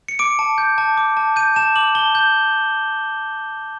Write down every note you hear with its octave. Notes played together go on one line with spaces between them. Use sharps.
C#7
D6 D7
A5
G6
A5
D6
A5
G6 D#7
A5 E7
D6 F#7
A5 G7
G6